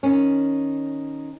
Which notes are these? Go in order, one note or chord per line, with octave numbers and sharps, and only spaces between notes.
D#3 C#4